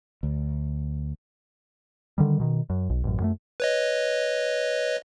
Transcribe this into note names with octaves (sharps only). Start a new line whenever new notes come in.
D2
D3 D#3 G3
B2 D#3
F#2
B1
A1 F#2
F#2 G3 A3
B4 C#5 D#5